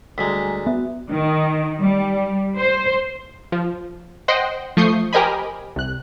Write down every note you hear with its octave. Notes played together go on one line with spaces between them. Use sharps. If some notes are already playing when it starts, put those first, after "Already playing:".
D2 G3 G#3 G#5 A#5 B6
B3 F#4 E5
D#3
G3
C5
F3
C5 D#5 F#5 G5 C6
F3 A3 C#6 D#6 G6 C7
G4 A#4 C5 D#5 G#5 B5
C2 F#6